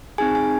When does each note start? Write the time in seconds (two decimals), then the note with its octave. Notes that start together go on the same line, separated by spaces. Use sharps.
0.18 C4 D#4 G#4 G#5
0.35 G#5